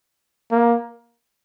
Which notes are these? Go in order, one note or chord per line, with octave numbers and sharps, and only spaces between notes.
A#3